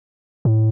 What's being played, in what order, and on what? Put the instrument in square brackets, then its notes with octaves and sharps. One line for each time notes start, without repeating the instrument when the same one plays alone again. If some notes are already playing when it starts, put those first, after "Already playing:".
[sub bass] A2